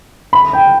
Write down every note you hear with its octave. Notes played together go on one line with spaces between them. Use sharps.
B5
G5